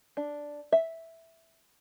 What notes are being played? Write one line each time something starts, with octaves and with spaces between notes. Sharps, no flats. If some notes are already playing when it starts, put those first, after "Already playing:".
D4
E5